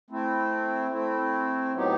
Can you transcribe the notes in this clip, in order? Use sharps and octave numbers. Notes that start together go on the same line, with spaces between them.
A3 C4 E4
A3 C4 E4
A2 F#3 B3 D#4 G4